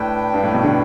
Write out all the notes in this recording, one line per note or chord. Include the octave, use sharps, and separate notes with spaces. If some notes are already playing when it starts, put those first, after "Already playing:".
Already playing: A2 D4 B4 G5
G2
A2
B2
D3